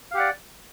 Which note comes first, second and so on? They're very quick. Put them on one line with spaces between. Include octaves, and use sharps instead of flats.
F5 G4 F#5 D5